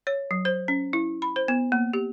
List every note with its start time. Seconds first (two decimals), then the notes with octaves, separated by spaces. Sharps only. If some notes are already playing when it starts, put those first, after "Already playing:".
0.07 C#5
0.31 F#3
0.45 C5
0.68 C#4
0.93 E4
1.22 B5
1.36 C5
1.48 B3
1.72 A#3
1.93 G4